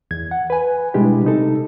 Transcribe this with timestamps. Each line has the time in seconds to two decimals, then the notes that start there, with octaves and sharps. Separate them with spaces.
0.11 E2 G#6
0.31 F#5
0.50 B4 G#5
0.94 B2 G3 G#3 D4 E4 G4
1.25 C3 D#4 A4